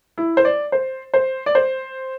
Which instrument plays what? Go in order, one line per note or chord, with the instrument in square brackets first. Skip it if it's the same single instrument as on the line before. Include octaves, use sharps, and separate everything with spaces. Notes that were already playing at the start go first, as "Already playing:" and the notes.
[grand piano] E4
C5
D5
C5
C5
D5
C5